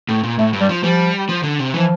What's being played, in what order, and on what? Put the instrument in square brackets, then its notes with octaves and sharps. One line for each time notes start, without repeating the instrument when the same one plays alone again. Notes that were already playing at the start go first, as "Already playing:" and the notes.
[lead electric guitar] A2
A#2
[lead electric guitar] A2 [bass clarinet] A3
[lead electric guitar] G2
[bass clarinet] G3
[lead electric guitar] F3
[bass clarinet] F3 [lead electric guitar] G3
[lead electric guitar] F3
D3
C3
[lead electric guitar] E3 [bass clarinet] F3